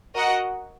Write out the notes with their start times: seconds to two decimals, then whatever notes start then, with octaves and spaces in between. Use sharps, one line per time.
0.15 F#4 A#4 D#5 F#5